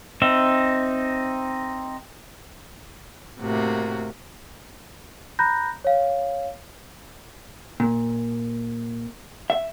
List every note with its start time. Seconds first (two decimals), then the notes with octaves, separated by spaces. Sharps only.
0.22 C4 D#4 E5
3.40 A2 C3 A#3 F#4
5.39 A#5 B5 F#6 G6 A#6
5.84 C#5 F5
7.80 A#2
9.50 E5